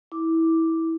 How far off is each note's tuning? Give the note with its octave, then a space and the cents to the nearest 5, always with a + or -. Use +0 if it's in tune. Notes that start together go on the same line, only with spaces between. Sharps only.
E4 -20 D6 +0